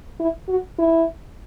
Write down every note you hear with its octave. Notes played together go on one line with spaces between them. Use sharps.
E4
F#4
E4